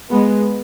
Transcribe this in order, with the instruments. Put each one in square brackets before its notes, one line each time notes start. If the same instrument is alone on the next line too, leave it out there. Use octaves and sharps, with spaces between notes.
[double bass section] G#3 B3